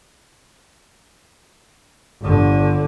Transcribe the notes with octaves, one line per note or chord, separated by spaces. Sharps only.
G1 D3